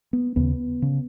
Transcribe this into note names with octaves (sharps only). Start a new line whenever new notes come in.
B3
D#2 C#3 B3
C#3